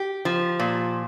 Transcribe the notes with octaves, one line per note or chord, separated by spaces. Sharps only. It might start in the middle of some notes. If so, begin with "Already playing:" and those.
Already playing: G4
F3
A#2